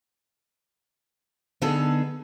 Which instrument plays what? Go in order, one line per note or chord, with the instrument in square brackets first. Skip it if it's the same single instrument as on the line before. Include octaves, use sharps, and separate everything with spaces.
[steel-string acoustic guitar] D3 B3 D#4 G#4 A4